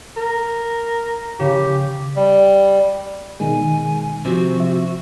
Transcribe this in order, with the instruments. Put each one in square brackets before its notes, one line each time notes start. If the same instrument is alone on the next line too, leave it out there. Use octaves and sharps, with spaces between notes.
[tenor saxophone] A#4
[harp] C#3 [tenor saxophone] G4
[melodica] G3
[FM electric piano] B2 D#3 G#3 [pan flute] G#5
[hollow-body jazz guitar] C3 C4 [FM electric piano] F3 [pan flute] F#4
[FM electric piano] F3 E5